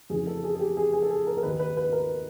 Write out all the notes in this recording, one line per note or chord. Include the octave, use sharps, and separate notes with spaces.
F2 C#3 E3 G#4
A4
G#4
G#4
G4
G#4
G#4
A4
G#4
A#4
A#4
D#2 D#3 B4
B4
B4
A#4